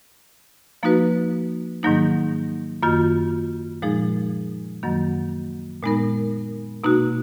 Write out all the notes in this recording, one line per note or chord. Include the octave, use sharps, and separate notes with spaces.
F3 A#3 D#4 F#4 B4
G#2 D#3 F#3 A#3 D#4
F#2 D#3 A#3 F4
A#2 F3 G#3 D#4 G#4
F#2 D#3 F#3 A#3
A#2 G#3 B3 D#4 A#4
B2 A#3 D#4 F#4